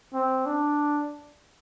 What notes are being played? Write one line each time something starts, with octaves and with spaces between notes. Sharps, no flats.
C4
D4